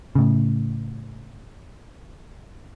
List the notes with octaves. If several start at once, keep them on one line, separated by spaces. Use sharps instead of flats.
A2 C#3